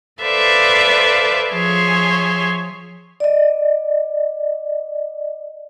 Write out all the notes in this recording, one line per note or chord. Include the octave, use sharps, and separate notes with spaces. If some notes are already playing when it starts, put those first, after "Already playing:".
A4 B4 C5 D5 E5 F5
F3 G#4 C#5 E5 C6
D5 D#5